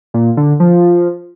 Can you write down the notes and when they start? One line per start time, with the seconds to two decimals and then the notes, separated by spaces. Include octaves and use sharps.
0.14 A#2
0.37 D3
0.60 F3